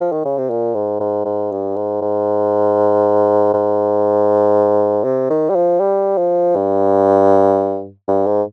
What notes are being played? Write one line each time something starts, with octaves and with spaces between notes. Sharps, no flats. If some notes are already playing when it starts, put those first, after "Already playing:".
F3
D#3
C#3
C3
A#2
G#2
G#2
G#2
G2
G#2
G#2
G#2
C3
D#3
G3
F3
G3
F3
G2
G2
G#2